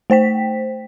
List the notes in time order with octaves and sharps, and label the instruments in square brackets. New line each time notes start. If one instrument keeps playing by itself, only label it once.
[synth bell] A3 C5 G5 B6